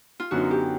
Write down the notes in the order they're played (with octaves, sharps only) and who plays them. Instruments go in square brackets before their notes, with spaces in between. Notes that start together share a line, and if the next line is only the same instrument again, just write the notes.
[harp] F4
[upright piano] F#2 D3 F#3 B3 D#4 [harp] F#4
[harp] G4